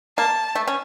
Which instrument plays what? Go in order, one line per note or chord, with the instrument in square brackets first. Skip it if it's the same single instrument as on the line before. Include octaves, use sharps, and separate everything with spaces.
[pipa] A#3 [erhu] A5
[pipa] A3
C#4